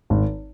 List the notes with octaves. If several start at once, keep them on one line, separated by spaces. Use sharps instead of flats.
G#1